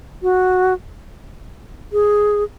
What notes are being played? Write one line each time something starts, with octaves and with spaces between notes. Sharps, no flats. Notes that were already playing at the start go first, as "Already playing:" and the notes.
F#4
G#4